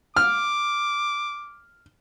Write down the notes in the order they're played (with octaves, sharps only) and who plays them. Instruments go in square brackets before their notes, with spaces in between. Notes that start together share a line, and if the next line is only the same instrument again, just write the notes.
[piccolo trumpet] D6 [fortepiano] F6